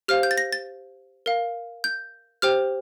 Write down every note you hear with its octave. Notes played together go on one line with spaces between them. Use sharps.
G4 C5 F5 F6
G6
A6
A#6
A6
A#4 F5
G6
G4 C5 G5 F6